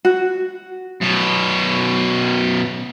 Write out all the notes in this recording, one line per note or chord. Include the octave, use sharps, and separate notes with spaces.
F#4
F#2 B2